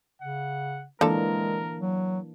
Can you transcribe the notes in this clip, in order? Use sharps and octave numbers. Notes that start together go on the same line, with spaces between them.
C#3 F#5
D3 E3 F3 G#3 A#3 D4 A4 A#4
F#3